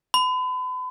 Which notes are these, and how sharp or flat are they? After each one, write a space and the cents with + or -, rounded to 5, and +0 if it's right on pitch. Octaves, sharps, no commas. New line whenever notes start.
B5 +40